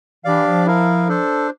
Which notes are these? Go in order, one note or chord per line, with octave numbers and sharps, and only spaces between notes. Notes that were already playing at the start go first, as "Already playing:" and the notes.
E3 D4 G4 D5 F5
F3
E4 A#4 F5
D4 A4 C5